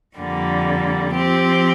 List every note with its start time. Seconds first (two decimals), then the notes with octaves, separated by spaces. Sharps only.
0.17 F2 D3 G3 A#3
1.13 F3 C4 G4